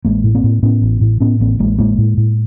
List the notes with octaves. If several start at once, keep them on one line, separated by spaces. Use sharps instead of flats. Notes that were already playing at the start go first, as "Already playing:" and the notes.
A1 G#3 A#3
A2
A#3 C4
A2
A2 B3 C#4
A1
A2
A2 B3 C#4
A1 A#3 C4
A1 G#3 A#3
A2 G#3 A#3
A2
A2